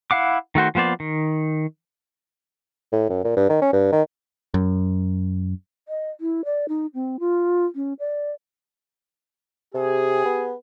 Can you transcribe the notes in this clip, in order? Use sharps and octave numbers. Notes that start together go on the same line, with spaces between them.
E4 F5 F#5 D6
D#3 A3 F#4 C5
F3 A#3 B3 C5 D5
D#3
A2
F#2
A#2
G2
D#3
C#4
G2
D#3
F#2
D#5
E4
D5
D#4
C4
F4
C#4
D5
C3 G4 G#4
B3